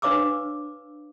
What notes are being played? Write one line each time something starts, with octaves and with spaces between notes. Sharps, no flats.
D4 B4 C#5 F5 D6 E6